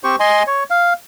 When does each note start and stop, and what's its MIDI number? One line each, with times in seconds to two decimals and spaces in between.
0.04 0.16 60
0.04 0.16 67
0.04 0.16 72
0.04 0.16 85
0.20 0.43 75
0.20 0.43 80
0.20 0.43 84
0.47 0.64 73
0.70 0.93 77